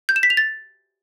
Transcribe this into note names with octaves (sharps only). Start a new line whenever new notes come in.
G6
E7
B6
F7
A6